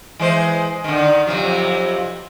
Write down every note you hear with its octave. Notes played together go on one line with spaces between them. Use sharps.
E3 G#3 C5
D3 D#3
F2 C3 F#3